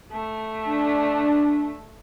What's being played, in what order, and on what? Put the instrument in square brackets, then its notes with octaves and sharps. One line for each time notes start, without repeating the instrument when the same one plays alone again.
[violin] A3
[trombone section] D4